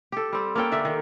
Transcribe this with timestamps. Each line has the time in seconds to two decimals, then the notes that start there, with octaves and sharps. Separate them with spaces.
0.12 G4 A4
0.33 G3 C4
0.55 A#3 C#4 A4 G5
0.72 D3 D5 E5
0.85 D#3